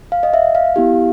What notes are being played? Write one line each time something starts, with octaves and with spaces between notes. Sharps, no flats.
F5
D#5
E5
F5
B3 E4 G4